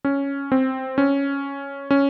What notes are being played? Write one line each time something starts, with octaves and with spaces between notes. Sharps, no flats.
C#4
C4
C#4
C#4